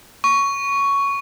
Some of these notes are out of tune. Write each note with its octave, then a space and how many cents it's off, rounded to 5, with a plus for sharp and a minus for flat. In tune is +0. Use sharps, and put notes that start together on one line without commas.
C#6 +10